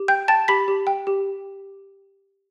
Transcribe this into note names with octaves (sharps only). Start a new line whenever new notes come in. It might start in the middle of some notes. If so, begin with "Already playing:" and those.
Already playing: G4
G5 G6
G5 A5 A6
G4 B5 B6
G4
G5
G4